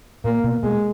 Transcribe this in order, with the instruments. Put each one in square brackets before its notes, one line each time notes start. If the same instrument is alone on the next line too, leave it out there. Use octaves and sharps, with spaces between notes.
[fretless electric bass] A#2 [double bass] A#3
[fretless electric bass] B2
[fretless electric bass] B2 [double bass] G#3